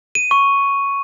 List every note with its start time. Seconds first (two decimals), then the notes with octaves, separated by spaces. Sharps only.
0.15 D#7
0.31 C#6